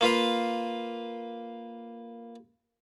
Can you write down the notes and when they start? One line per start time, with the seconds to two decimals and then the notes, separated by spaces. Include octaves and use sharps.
0.01 A#3 F4 B4 F5